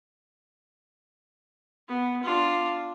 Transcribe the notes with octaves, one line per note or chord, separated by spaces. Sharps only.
B3
D4 F4